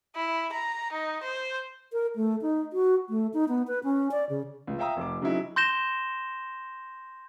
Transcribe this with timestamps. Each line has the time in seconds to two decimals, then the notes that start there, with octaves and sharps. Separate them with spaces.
0.16 E4
0.52 A#5
0.92 D#4
1.23 C5
1.93 A#4
2.16 A3
2.42 D#4
2.73 F#4
3.09 A3
3.34 D#4
3.48 B3
3.67 B4
3.84 C#4
4.11 D5
4.29 C#3
4.67 C#2
4.79 E5 F5 G5 A#5 D#6 E6
4.97 F1 D6
5.21 C#3 F#3 C4 D#4 E4
5.56 C6 G6 A#6 E7 G7